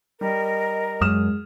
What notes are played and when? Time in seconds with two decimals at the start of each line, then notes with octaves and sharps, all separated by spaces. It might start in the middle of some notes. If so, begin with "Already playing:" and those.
0.21 G3 A#4 D#5
1.01 F#2 G#3 D#6 F6 E7